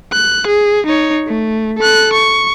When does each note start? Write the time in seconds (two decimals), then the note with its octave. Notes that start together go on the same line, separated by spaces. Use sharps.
0.13 F#6
0.47 G#4
0.86 D#4 C#5
1.27 A3
1.78 A4 F#6
2.13 C#6